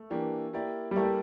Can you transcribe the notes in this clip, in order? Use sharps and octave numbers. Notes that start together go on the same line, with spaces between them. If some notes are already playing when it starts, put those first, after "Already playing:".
Already playing: A3
E3 A#3 D4 G4
A#3 E4 G4 A#4 D5
G3
A3 A#3 E4 G4 A#4 D5